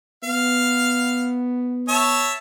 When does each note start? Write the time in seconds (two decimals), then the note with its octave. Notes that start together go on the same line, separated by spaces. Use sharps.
0.24 B3 F5
1.89 C#5 E5 A5